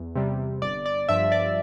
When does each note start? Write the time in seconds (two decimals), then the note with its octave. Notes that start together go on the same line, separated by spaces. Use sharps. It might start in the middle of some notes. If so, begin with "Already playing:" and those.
Already playing: E2
0.15 C3 G3
0.61 G1 D5
0.86 D5
1.09 G2 F3 E5
1.32 D5